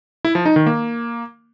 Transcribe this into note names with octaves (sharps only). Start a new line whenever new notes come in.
E4
F3
D#4
D#3
A#3